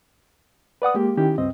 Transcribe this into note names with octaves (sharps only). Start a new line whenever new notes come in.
B4 D5 F#5 D#6
G#3 A#3 G4
D#3 C#4 E4 G4
C#2 G2 C4 D#5